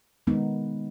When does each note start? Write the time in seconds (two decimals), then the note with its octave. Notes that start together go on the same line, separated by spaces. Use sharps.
0.27 D#3 G#3 B3 D#4